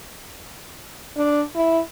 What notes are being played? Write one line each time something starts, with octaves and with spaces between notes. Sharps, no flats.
D4
E4